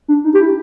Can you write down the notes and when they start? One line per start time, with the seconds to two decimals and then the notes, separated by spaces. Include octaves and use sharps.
0.08 D4
0.24 D#4
0.34 G4
0.40 E4